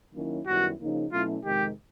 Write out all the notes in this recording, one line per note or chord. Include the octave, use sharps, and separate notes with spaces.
D#3 F#3 A#3 C#4 E4
F#2 D#3 G3 B3 E4 F#4
C#3 F3 A#3 D#4
B2 F#3 A3 C#4 E4 F4
F2 C3 D#3 G#3 G4